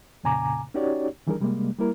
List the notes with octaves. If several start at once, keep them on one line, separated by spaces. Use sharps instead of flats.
F2 A#2 C#3 G#5 A#5 D6
C#4 D#4 F#4 G4 C#5 D5
D#3 E3 G3 D4 G#4 A#4
C3 G3 G#3 A#3
G3 A#3 E4 A#4